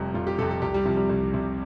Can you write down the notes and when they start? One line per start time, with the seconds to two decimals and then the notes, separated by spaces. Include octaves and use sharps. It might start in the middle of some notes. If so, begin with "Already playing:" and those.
Already playing: F1 F2 C3 G3
0.14 F1 F4
0.27 G4
0.39 F2 C3 A4
0.51 A4
0.62 C2 G4
0.74 G3
0.85 C3 F3
0.97 G3
1.09 C2
1.34 C3